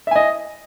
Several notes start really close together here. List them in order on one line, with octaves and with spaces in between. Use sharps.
E5 G#5 D#5